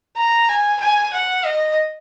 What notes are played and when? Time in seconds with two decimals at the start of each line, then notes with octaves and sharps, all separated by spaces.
0.17 A#5
0.49 G#5
0.80 G#5
1.13 F#5
1.45 D#5